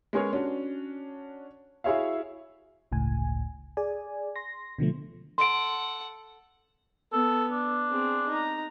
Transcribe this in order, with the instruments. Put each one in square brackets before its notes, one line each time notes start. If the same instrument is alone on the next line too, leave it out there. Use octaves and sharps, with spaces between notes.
[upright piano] G#3 B3 C#4 G#4 A#4 C#5
C#4 D4 F#4
E4 F#4 G#4 C#5 E5 F5
[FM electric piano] G1 C#2 A2 G#5
G#4 D5 G#5
C6 A#6
B2 D3 F3 A3
[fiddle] A4 F#5 [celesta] C6 D7
[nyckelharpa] B3 [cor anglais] A4
[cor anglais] D4
[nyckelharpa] C4 G#4
D#4 A#5